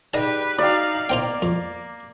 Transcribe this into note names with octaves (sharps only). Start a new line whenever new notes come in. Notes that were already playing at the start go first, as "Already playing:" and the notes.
D#4 G4 G#4 B4 D5 D#5 A5
D#4 F#4 D5 F5 G5
A#3 B3 D#4 C5 F5 G5
F2